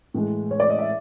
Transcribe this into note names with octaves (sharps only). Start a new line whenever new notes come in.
A2 E3 G#3
C#5
D5
D#5
E5